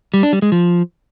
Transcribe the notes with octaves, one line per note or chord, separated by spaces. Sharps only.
G3
D4
G3
G#3
F3